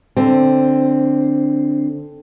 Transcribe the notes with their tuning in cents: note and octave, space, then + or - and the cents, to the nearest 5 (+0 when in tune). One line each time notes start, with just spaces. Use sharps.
D3 +0 C4 +0